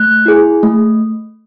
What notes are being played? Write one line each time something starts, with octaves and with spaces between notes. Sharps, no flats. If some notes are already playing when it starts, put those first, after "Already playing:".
Already playing: A3 F#6
E4 G#4
A3